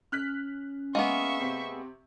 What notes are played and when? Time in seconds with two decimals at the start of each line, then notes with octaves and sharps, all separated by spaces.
0.12 C#4 F6 F#6 B6
0.95 G#3 A#3 B3 E5 F5 C#6
1.40 C3 C4